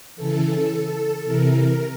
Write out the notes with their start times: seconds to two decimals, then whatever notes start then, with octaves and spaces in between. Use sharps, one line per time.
0.16 C#3 E3 A4
1.24 C3 E3 A#4